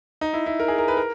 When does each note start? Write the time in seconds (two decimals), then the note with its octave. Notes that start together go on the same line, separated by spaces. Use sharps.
0.21 D#4
0.33 E4
0.46 E4
0.60 A#4
0.68 G#4
0.78 A#4
0.88 B4
0.97 A#4